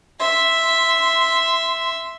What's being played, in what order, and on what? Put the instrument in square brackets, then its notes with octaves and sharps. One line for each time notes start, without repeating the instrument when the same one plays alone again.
[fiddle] E5 C6